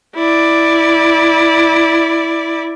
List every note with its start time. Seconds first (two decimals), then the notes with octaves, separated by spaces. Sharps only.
0.15 E4 D5